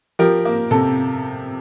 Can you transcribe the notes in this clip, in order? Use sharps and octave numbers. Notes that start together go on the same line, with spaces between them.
F3 G4 A#4
A#3
C3 A4